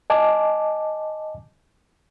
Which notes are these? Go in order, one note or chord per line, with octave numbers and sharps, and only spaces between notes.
D#5 G#5 A5 D6